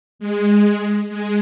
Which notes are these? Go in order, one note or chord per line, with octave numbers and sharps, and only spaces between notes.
G#3
G#3